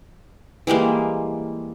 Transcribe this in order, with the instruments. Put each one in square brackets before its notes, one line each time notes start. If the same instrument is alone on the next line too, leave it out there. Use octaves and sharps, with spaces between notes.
[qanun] E3 G3 G#3 A#3